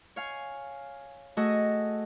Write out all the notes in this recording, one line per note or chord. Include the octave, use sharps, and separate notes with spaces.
C#5 F5 G#5
A3 F#4 G#4 A4 D#5 D#6